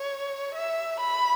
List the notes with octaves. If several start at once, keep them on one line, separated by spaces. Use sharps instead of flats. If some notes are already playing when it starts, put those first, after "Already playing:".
Already playing: C#5
E5
B5